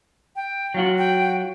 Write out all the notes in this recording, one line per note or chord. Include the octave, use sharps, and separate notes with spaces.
G5
F#3 F4 F#4
G5